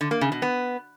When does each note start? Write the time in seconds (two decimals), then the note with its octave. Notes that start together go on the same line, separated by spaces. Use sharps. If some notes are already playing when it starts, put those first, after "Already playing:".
0.01 D3
0.11 A#3
0.21 C#3
0.32 B2
0.42 B3